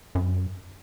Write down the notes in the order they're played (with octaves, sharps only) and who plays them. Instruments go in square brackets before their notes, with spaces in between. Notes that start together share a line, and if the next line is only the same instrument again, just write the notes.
[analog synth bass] F#2